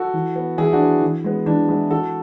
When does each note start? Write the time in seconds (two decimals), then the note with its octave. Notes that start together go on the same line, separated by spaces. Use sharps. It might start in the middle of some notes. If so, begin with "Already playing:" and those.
Already playing: F#4 A4
0.14 E3
0.36 B3
0.58 E3 E4 G#4
0.73 D4 F#4
0.80 B3
1.02 E3
1.24 G#3 B3
1.46 E3 D4
1.68 G#3 B3 E4 G#4
1.90 E3 F#4 A4